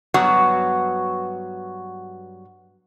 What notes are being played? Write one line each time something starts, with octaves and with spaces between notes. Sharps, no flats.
G2 F#3 B3 F#4